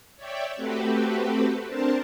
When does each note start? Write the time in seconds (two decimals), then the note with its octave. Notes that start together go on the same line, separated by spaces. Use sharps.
0.17 C#5 D5 E5 G5
0.56 A3 C4 F#4 G4 A4 B4
1.68 C4 D4 A#4 C5 A5